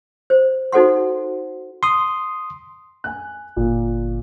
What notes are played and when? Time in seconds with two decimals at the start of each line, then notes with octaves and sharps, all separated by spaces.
0.30 C5
0.72 D#4 F#4 A4 C5 F#5 C6
1.83 C6 D#6
3.04 G#5 F#6
3.56 G1 A#2